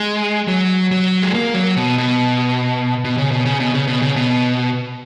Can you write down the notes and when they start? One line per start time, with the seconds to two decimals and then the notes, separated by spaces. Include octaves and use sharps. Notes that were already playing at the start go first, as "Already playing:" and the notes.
Already playing: G#3
0.48 F#3
0.91 F#3
1.22 G#3
1.34 A#3
1.54 F#3
1.76 B2
1.98 B2
3.04 B2
3.17 C#3
3.31 B2
3.45 C#3
3.60 B2
3.74 C#3
3.87 B2
4.02 C#3
4.16 B2